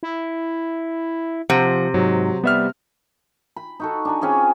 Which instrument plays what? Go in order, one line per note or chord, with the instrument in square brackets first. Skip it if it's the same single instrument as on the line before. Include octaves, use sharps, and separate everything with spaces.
[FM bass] E4
[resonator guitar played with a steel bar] C3 [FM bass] F3 [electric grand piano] F#5
[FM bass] G#2 [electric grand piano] F#3
[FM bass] G3 [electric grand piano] B3 E5 F6
[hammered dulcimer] B5
D#4 F#4 A4
D4 G#5 A#5
C4 C#4 F4 G#4